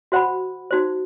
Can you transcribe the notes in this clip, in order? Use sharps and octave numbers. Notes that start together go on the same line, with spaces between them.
F#4 C5 F#5 B5
D#4 F#4 C5